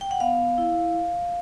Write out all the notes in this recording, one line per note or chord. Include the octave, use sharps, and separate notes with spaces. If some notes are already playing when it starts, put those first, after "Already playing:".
G5
F#5
B3 F5
E4